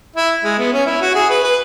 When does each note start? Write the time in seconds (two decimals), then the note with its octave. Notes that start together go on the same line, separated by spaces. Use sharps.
0.16 E4
0.44 G#3
0.58 B3
0.73 C#4
0.87 E4
1.01 F#4
1.15 G#4
1.30 B4
1.44 B4